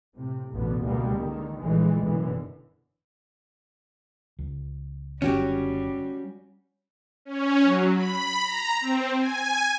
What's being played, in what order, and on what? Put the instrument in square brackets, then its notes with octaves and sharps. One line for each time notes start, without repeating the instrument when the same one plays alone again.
[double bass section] A2 C3
A1 E2 B2 D3 B3
C#2 B2 D3 G3 G#3 A#3
D3 D#3
A#1 D3 E3 G#3 A3
F#1 F#2 B2 D3 E3
[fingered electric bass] C#2
[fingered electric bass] F#1 D3 [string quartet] G3 [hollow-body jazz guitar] C#4 F#4 G4
[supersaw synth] C#4
F#3
B5
A#5
C4
G#5